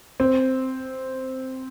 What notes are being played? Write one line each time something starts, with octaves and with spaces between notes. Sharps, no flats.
C4